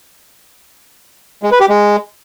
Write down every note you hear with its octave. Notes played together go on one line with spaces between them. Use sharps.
G#3
B4
G4
G#3